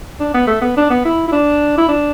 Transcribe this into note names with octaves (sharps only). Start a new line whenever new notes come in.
D4
B3
A3
B3
D4
B3
E4
E4
D4
E4
D4